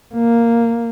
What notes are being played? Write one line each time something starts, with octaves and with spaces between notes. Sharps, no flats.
A#3